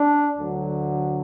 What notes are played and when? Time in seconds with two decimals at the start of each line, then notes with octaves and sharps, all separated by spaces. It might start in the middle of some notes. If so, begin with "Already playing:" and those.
Already playing: D4
0.36 D2 D3 F#3